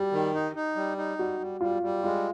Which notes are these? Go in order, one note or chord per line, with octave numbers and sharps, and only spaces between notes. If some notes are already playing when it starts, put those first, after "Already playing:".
Already playing: G3 F#4 G4
D#3
D#4
D#4
G3
D#4
G3 F#4
G3
G3 F4
G3
G#3 F4